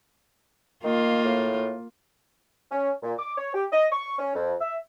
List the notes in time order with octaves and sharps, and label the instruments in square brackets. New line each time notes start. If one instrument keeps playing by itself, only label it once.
[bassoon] D#3 [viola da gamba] A#3 F4
[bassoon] A2
[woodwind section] C#4
A#2
D6
C#5
G4
D#5
C#6
C#4
F2
E5